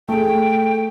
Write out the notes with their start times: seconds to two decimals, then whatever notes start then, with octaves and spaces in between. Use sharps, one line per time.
0.09 A3 G#4 G5